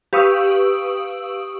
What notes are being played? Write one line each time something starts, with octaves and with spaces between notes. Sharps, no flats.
G4 B4 F5 C#6 D#6 E6